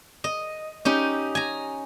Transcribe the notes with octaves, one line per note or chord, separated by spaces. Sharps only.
D#5
C#4 D#4 G4
G#5 A#5